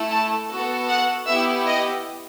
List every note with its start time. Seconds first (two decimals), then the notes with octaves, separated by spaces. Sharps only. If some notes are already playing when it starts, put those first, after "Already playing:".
Already playing: A3 E4 A4
0.10 A5
0.50 B3 F#4 A4
0.89 F#5
1.28 B3 E4 G4 E5
1.67 D#5